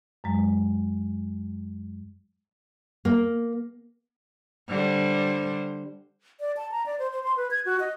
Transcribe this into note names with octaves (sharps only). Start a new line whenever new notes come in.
F#2 F#3 G#3
A#3
D3 G3 C5
D5
A5
A#5
D5
C5
C5
C6
B4
G#6
F#4
D#5